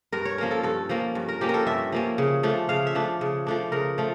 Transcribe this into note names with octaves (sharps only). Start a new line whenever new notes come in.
G2 A#4
C#5
F3 A#3 C#4 A#4
A4
G2 A4
F3 A#3 C#4
G2
A#4
F3 A#3 C#4 G4
A#4
A4
G2 E5
F3 A#3 C#4
C#3
F3 A3 D4
C#3 F5
E5
F3 A3 D4
C#3
F3 A3 D4
C#3 A#4
F3 A3